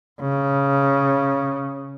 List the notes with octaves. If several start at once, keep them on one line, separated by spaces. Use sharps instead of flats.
C#3